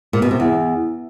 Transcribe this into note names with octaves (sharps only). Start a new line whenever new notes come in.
A#2
B2
C3
E2